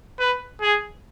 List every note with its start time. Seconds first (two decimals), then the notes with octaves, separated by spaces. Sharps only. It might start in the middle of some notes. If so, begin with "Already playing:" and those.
0.19 B4
0.62 G#4